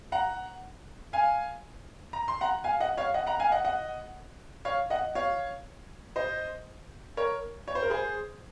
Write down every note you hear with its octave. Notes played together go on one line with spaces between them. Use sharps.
F#5 A#5
F5 G#5
A#5
C6
F#5 A#5
F5 G#5
D#5 F#5
C#5 F5
D#5 F#5
F#5 A#5
F5 G#5
D#5 F#5
D#5 F#5
C#5 F5
D#5 F#5
C#5 F5
C5 D#5
A#4 C#5
C#5
C5
A#4
G#4 C5